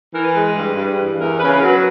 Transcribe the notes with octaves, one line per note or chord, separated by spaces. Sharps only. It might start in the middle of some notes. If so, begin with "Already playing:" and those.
E3 A#4
B4
G#3
G2
G2
E3
E2 A#4
C#3 B4
A#4
F#3
B4